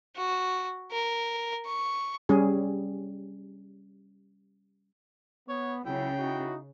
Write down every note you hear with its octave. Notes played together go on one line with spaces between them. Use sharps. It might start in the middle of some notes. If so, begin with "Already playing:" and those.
F#4
A#4
C#6
G3 C#4 G#4
B3 C#5
C#2 C#3 F#3 E4 G5
D#4 E4 F#4